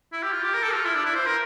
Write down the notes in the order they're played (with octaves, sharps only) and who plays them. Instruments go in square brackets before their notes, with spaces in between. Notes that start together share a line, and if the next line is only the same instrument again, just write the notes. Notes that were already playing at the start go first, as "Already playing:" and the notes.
[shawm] E4
G4
F4
G4
A#4
A4
F4
E4
D4
E4
C5
A#4